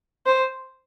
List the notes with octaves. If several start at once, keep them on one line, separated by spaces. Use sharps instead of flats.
C5